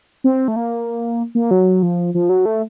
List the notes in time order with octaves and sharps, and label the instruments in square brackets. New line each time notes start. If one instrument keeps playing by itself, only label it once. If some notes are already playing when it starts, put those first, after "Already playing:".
[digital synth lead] C4
A3
A#3
A#3
F#3
F3
F3
F#3
A3